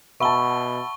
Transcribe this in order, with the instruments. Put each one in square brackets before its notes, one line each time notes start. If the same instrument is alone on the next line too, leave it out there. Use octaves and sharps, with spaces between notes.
[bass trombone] B2 [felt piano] E5 A5 [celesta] F#5 B5 E6 [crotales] C#6 G7